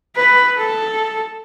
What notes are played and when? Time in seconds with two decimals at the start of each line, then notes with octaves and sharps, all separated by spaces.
0.16 B4
0.58 A4